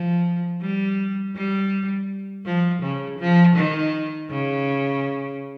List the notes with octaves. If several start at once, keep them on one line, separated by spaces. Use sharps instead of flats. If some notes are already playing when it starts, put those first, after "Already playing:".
Already playing: F3
G3
G3
F3
C#3
F3
D#3
C#3